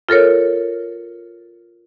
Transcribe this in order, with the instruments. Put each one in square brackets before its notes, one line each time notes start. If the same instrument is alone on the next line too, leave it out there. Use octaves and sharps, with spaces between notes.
[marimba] F4 A4 A#4 C#5